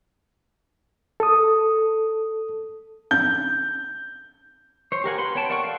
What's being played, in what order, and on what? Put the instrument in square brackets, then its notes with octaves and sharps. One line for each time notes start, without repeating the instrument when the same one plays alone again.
[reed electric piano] A4 D#6
[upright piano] G6
[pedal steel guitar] C5 C#5
G4 A#4 F#5 G#5
B4 F#5 B5 C6
B3 C#5 F#5 G5 A5
A#4 D5 F#5 G5 C#6
A4 F5